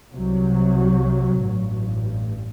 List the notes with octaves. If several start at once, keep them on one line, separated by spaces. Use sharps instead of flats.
C2 C3 F#3
A1 G2